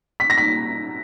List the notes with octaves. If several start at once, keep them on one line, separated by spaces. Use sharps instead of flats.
B6
A#6
B6